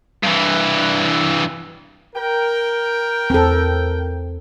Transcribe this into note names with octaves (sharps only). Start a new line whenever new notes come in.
G2 E3
A#4 G5
E2 C4 A4